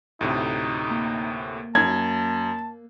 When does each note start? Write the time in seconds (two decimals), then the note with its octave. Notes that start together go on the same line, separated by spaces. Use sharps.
0.21 D2 A2 C3 D#4
0.90 A#3
1.75 F#2 A5 G#6